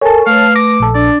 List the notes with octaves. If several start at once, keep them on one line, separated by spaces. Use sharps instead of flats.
A4 A#4 C#5 G#5 A5
A3 B4 F5
D6 A#6
A#1 A4
D4 D5